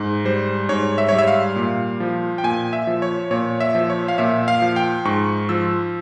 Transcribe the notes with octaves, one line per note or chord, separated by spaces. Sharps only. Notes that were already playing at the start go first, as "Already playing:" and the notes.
Already playing: G#2
G3 C5
G#2 C#5
E5
G3 C#5
E5
F5
A#2
F3
G5
A#2 G#5
E5
F3
C#5
A#2 C#5
E5
F3
C#5
F5
A#2 E5
F5
F3
G5
G#2 C#6
F3 E6